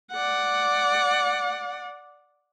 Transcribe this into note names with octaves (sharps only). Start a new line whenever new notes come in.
D5 F#5